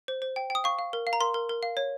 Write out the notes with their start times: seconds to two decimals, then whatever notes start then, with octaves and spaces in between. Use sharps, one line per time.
0.08 C5
0.22 C5
0.36 G5
0.50 G5 D#6
0.64 F5 C#6
0.79 F5
0.93 A#4
1.07 F5
1.13 A#5
1.20 A#4 C6
1.34 A#4
1.49 A#4
1.63 F5
1.77 C#5